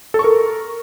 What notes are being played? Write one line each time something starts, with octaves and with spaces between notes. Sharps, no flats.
A4
C#6
A#4